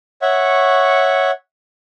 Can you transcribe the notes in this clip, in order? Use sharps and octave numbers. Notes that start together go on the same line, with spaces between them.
C#5 E5 F#5 C#6